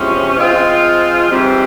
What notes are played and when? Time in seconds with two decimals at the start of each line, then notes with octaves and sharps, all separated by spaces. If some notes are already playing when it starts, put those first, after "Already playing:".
Already playing: E2 C3 F3 G#3 C#4
0.36 F3 G#3 C4 F4
1.31 G#2 E3 G3 C4